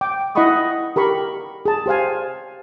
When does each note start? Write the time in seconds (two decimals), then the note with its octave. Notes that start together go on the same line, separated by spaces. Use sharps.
0.01 G5 D6
0.35 E4 D#5 F#5 B5 C#6 D#6
0.96 G4 A#4 B5 C#6
1.66 G#4 A5
1.86 G4 C5 F5 G#5